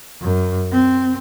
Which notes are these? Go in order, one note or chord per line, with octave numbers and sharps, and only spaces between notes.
F#2
C4